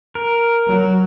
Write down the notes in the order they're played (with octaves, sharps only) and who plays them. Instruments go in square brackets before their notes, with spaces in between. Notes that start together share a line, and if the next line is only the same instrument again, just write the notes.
[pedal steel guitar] A#4
[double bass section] F#3